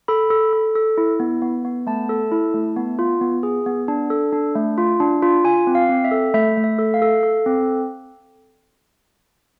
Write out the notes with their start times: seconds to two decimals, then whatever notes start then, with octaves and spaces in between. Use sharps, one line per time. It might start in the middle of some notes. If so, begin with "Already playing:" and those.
0.08 A4 B5
0.30 A4
0.53 A4
0.75 A4
0.98 E4
1.20 B3
1.42 B3
1.65 B3
1.87 A3 A5
2.09 A4
2.32 E4
2.54 A3
2.76 B3
2.99 F4
3.21 B3
3.43 G#4
3.66 B3
3.88 D4
4.10 A4
4.33 D4
4.56 A3
4.78 F4
5.00 D4
5.23 F4
5.45 F4 G#5
5.67 C4
5.75 F5
5.89 C4
6.04 E5
6.11 A4
6.34 A3 E5
6.57 A3
6.64 E5
6.79 A4
6.94 F5
7.02 A4
7.23 A4
7.46 C4